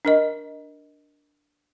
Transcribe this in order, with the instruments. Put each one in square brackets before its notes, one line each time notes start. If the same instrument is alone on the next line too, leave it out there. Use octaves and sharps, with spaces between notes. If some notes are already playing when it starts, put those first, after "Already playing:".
[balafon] D4 A#4 D#5